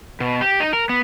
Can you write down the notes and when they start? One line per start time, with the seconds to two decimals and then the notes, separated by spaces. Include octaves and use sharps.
0.20 B2
0.41 G4
0.60 D#4
0.73 A#4
0.89 B3